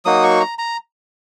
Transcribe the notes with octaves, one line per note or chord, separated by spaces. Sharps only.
F#3 A#3 D#4 F#4 D#6
C#6
A#5
A#5